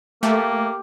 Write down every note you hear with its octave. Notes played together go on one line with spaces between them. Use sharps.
A3 A#3 G4